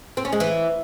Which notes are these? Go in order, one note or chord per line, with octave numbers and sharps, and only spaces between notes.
C4
C#4
G#3
E3